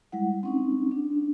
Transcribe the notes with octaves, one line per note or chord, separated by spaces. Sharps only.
G3 G#3 E4 F#5
C4 C#4 D#4
D4